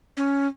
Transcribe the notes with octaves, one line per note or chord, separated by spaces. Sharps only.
C#4